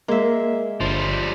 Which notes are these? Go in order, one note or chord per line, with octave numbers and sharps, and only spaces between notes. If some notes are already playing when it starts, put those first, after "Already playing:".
G#3 A#3 A#4 E5
G1 D3 F3 G3 C6